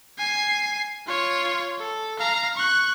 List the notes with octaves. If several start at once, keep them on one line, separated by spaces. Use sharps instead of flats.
G#5 C7
F4 C#5
A4
F5 A#5
C#6 F#6